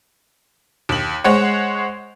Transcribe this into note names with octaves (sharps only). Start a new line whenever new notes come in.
D#2 F#7
G#3 C5 C#5 F#5